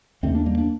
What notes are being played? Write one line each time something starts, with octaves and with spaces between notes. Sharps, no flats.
D#2 D3 A3 C4
A#3 D4
G3 A#3
A#3 D4